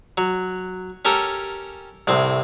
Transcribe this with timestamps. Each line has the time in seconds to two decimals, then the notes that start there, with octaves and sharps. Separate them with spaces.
0.18 F#3
1.05 C#4 G4 A4 A#4
2.07 C2 A2 C4